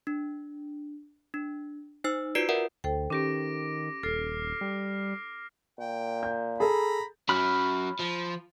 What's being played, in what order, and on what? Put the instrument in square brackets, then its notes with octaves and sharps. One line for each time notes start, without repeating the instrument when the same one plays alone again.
[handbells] D4
D4
D#4 C5 E6
F4 F#4 B4 D5 C7 D7
A#4 D5 E5 F#5
[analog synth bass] D2 [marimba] A4 C5 G5
[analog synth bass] D#3 [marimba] C#4 G4 [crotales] D6 A#6 D7
[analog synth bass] D#1 [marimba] A4 [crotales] F6 C7
[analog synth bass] G3
[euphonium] A#2 [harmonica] G5
[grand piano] G6
[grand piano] G#4 A4 [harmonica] A#5 B5
[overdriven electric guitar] F#3 C#4 [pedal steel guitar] B5 F6 F#6
[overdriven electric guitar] F3